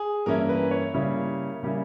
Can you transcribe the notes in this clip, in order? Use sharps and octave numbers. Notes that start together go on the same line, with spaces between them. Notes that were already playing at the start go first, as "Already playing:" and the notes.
Already playing: G#4
G2 E3 A#3 C#4 E4 A#4
B4
C#5
C#3 G3 A#3 C#4 E4
C#3 G3 A#3 C#4 E4